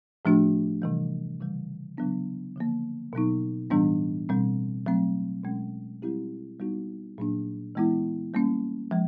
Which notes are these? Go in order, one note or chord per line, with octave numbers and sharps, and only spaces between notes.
A2 F3 A3 D4 F#4
C3 E3 G3
C#3 E3 G3
C#3 F#3 B3 D4
D3 F3 A#3
B2 F#3 B3 D#4
A2 E3 G3 B3 D4
B2 G3 C4
F#3 A3 C4
B2 G#3 C#4
G3 C4 E4 G4
G3 B3 D#4 F#4
A#2 F#3 A#3 D4
E3 G#3 B3 E4
G3 A#3 C#4
F3 G#3